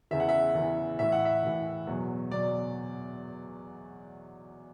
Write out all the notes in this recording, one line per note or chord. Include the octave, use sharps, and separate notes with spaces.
E2 C#3 E3 E5
F#5
E5
E2 C#3 E3
A2 E3 E5
F#5
E5
A2 E3
E2 B2 F#3
B2 F#3 D5